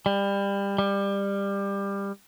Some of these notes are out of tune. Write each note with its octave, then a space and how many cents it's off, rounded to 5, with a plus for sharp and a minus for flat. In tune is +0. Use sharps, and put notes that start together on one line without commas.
G3 +25
G3 +20